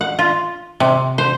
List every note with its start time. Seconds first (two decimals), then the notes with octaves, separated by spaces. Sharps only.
0.01 F#5
0.19 F4
0.80 C3
1.18 C5